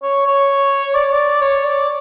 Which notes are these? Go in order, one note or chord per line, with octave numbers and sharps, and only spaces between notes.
C#5
C#5
D5
D5
C#5
D5